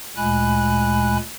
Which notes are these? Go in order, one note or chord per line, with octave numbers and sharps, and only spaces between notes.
D2 A#2 G#3 G#5 B5 F#6